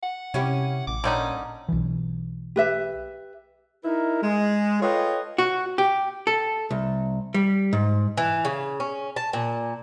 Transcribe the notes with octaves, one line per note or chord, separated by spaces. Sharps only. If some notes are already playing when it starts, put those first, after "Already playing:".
F#5
C3 C#4 E4 G4
A1 D6
A#2 D3 G3 C#4 D#4
B1 E3
G4 B4 E5
D#4 E4 A#4
G#3
F4 A4 B4 C#5 D#5 G5
F#4
G4
A4
C2
G3
G#2
E3
C#3
C#4
A5
A#2